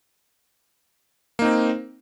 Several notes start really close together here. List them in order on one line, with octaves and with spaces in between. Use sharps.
A#3 D#4 C4